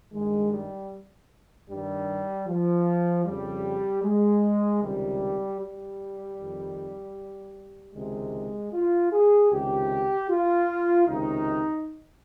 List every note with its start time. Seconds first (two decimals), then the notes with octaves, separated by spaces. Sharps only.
0.12 G2 D#3 G#3
0.51 G3
1.69 G2 D#3 G3
2.47 F3
3.25 F2 C#3 G3
4.03 G#3
4.81 C#2 C3 D#3 G3
5.60 G3
6.38 F2 D#3
7.94 C#2 C3 D#3 G#3
8.73 F4
9.12 G#4
9.51 C#2 C3 D#3 G4
10.29 F4
11.07 C#2 C3 D#3 D#4